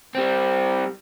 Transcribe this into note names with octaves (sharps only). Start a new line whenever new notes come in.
G3 C4